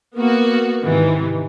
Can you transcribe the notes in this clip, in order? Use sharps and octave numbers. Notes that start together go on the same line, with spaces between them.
A#3 B3 F#4
G#2 C3 D#3 E3